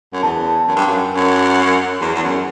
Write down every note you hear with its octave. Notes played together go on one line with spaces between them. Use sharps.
F#2
E2 A5
F#2
G2
F#2
F#2
E2
E2
F#2